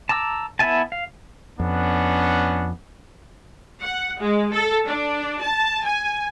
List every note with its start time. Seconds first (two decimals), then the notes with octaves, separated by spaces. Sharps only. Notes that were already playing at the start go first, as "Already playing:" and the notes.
0.09 A5 A#5 D6 E6
0.59 B3 E4 E5 G#5 A5
0.92 F5
1.60 F2 B3 C#4 D4
3.82 F#5
4.21 G#3
4.53 A4
4.86 D4
5.42 A5
5.85 G#5